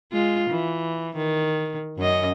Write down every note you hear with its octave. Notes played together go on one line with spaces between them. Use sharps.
G#3 F4
E3
D#3
F#2 C#4 D#5